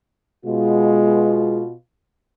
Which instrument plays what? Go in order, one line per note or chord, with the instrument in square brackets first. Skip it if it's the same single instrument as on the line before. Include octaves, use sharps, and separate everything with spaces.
[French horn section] B2 F4 [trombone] G#3